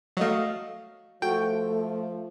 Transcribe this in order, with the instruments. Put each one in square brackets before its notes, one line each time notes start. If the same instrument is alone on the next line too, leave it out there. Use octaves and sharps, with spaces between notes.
[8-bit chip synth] F#3 A3 [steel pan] F#4 D#5 F5
[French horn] F3 [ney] A3 [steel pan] F#4 A4 [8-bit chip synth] G5